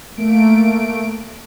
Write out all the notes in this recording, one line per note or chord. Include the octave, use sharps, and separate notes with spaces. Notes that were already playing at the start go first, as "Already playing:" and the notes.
A3 A#3 D7